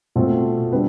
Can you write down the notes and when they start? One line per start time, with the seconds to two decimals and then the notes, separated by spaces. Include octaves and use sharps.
0.16 B2 A3 C4 F4 A4
0.71 D3 G3 B3 D4 G4 B4